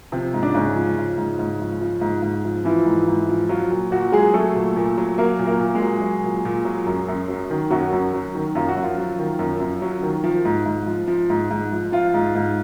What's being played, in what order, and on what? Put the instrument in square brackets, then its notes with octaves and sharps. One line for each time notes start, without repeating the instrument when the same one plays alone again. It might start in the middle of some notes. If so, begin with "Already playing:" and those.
[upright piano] C3 F3 C4
G#2
D4
G#2 C#3 C#4
F3
F3
G#2
G#2
F3
F3
G#2
G#2
F3
E3 F3 E4
G#2
G#2
F3
F3 F#3 F4
A#2
A#2 F#3 F#4
F#3 G#3 G#4
F#3 A3 A4
A#2
A#2
F#3
F#3 A#3 A#4
A#2
A#3 A#4
A#2
G#3 G#4
F#3
F#3
A#2
A#2
F#3
F#2
F#2
F#3
D#3
F#2 F#3 F#4
F#2
F#3
D#3
F#2 F4
F#4
F#2
F3 F4
F#3
D#3
F#2
F#2
F#3
D#3
F3
G#2
G#2
F3
F3
G#2
G#2
F3
F3 F4
G#2
G#2